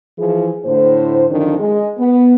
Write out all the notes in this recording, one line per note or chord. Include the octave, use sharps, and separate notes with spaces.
E3 F3 E4 G#4
A2 D3 C5
F#2 D3 D#3 F3 C4 D4
G#3
B3